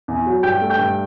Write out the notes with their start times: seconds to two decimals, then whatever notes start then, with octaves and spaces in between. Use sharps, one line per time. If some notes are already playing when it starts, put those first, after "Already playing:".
0.08 E2
0.26 F#3
0.43 G2 G5 G6
0.61 A3
0.70 G5 G6
0.79 G2